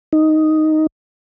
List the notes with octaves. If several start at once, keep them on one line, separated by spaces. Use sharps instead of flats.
D#4